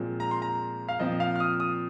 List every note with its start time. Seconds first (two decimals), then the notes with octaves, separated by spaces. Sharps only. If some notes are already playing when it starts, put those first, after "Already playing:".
Already playing: A#2 F3 G#3 C4
0.20 A#5
0.31 C6
0.42 A#5
0.89 F5
1.00 A#2 F3 C4 D#5
1.20 F5
1.36 F6
1.40 D#6
1.60 D#6